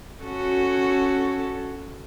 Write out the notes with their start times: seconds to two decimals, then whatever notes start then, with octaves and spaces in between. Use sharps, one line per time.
0.22 C#4 F#4 A4